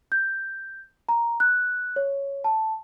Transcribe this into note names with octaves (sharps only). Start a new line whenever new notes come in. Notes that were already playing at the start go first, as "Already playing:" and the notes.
G6
A#5
F#6
C#5
A5